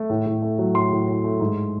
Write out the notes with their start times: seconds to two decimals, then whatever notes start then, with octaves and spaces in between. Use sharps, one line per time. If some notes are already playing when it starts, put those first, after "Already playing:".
Already playing: A3
0.10 A2
0.26 A2
0.42 A3
0.58 F#3
0.74 A2 C6
0.92 A2
1.08 A2
1.24 A3
1.40 G#2